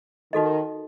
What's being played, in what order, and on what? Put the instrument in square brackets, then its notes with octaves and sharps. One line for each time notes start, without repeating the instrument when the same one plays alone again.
[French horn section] D#3 [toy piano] D#4 F#4 A4 D#5